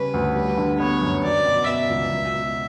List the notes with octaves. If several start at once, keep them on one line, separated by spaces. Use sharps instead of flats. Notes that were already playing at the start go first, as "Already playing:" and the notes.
Already playing: C#3 G3 C#4 B4
D2
G3 B4
D3
B3 C#5
F#2
F#3 D5
B2
B3 E5
C#2
F#3
B2